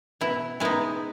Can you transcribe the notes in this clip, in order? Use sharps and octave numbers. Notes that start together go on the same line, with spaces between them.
B2 E4
G#3 B3 D#4 E4